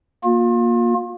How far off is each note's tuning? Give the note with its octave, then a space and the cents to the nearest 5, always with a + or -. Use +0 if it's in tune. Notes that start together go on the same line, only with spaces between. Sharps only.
A#3 +15 F4 +35